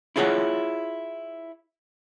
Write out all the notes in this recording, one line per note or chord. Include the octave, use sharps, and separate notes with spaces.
E4 F4 G#4 C#5 F#5